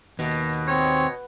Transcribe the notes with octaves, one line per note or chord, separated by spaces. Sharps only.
D#2 B2
C4 C#5